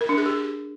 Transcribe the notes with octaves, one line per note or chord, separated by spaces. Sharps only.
A#4
D4
G#4
G4